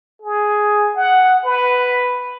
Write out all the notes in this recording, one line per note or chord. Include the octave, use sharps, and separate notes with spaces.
G#4
F#5
B4